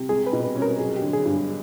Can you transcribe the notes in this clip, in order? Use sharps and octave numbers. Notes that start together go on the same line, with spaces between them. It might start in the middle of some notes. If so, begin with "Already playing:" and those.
Already playing: C3
G#3 G#4
B4
B2
B4
C#4
A#4
F#3 G#4
G4
D3
G#4
G2